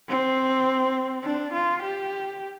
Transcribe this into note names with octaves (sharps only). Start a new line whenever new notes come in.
C4
D4
F4
G4